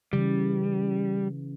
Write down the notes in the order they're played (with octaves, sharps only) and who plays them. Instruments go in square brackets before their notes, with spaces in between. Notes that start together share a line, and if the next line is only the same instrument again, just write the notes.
[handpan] C#3 E3 [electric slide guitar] G3